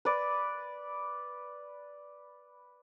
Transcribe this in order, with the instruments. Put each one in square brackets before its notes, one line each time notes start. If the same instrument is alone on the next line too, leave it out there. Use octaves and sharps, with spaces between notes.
[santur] B4 D5